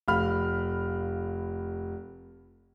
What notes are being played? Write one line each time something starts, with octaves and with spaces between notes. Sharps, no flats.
F1 F5 B5 F6